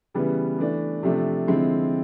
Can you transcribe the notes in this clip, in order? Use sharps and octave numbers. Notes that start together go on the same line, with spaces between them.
C#3 E3 G3 B3
E3 A3 D4
C3 F3 A3 D4
D3 F3 G#3 C4 E4